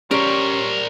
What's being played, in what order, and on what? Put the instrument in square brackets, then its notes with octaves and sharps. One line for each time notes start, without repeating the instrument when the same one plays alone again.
[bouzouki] G3 [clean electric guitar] C#4 A#5 [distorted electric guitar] A#4 C5 [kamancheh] C#5